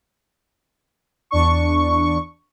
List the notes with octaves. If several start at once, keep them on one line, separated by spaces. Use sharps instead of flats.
E2 D4 C#6